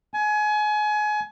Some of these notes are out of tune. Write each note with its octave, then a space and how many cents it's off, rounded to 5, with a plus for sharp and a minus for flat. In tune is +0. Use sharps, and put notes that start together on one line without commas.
G#5 +30